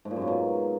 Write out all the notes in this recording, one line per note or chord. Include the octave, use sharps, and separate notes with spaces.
G#2
A#2
F#2
G#2
B2